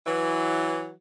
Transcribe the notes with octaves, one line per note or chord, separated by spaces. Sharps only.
E3 F#3